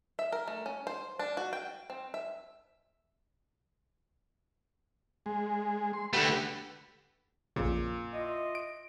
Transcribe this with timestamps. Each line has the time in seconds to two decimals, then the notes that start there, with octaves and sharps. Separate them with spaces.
0.19 E5
0.32 A#4
0.48 A3
0.66 C#4
0.87 C5
1.19 D4
1.37 F#4
1.53 G5
1.90 C4
2.14 E5
5.26 G#3
5.93 C6
6.13 D3 A3 G4 B4 F#5
7.56 A#1 F2 A#2 C#3
8.14 E4 F4 D#5
8.55 D7